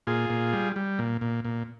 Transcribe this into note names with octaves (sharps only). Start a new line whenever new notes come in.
A#2 F4 G#4
A#2
G3
G3
A#2
A#2
A#2